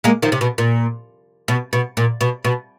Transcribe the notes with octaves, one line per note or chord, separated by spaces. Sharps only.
G#3 A#3
D#3 F3
C3
B2
A#2
B2
B2
A#2
B2
B2